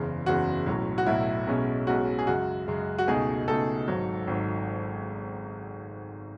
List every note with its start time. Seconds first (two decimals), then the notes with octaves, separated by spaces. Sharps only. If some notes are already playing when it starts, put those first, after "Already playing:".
Already playing: F#1 E2 C#3
0.26 F#1 E2 C#3 F#4
0.66 B1 A2 F#3
0.98 F#4
1.06 B1 A2 F#3 E4
1.47 B1 B2 G#3 C#4
1.87 B1 B2 G#3 C#4 F#4
2.19 G#4
2.27 F#2 C#3 G#3 F#4
2.68 F#2 C#3 G#3
2.98 F#4
3.08 C#2 B2 A3 D#4 G#4
3.48 C#2 B2 A3 D#4 A4
3.88 G#1 G#2 F#3
4.27 G#1 G#2 F#3